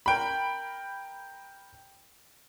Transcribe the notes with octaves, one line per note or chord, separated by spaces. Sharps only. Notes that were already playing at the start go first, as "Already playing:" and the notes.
A#4 G5 B5